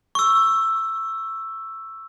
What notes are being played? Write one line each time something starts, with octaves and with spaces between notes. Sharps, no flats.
C#6 E6